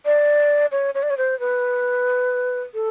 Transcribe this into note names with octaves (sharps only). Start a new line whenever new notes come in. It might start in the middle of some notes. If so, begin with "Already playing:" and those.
D5
C#5
C#5
D5
C#5
C5
B4
A4